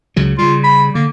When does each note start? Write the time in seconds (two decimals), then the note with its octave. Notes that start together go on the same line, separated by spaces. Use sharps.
0.16 C#2 C#3 F#3
0.38 C#3 G3 F4
0.64 B5
0.95 D3 A#3